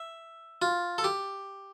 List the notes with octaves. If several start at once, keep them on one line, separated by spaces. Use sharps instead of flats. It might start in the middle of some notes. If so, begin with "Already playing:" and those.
Already playing: E5
F4
A4
G4